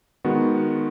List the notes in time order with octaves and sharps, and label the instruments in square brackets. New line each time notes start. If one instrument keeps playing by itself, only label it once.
[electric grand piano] D#3 G#3 B3 F#4